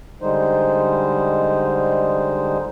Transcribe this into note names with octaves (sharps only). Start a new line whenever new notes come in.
D3 G3 G#3 D#4 C5